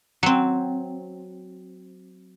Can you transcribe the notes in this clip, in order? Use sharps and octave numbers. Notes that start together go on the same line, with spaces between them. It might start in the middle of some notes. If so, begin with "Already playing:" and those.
F#3 C4